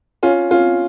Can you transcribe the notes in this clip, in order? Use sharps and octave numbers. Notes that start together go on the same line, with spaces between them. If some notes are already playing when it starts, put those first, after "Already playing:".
C#4 F4
C#4 F4